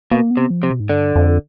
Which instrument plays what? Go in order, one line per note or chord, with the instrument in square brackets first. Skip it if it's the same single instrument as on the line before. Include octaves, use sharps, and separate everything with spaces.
[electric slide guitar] B2 [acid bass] A#3
[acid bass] B3
[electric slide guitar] C3
[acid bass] F3
[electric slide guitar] C3
[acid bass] B2
G#2
[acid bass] G2 [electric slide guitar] D3
[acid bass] F2